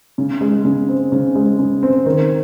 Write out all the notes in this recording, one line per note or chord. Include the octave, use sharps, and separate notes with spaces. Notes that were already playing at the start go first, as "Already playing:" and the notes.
C#3
G#3
C#3
C4
C#3
G#3
C#3
C4
D#3